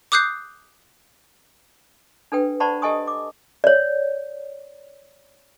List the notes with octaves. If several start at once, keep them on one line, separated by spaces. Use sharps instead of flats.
D6 D#6 F#6 G6 C7
D4 A4 B4 G5
C5 D5 F#5 A5 B5 C#6
G4 A4 D#5 G#5 C#6 D#6
D6
C#5 D5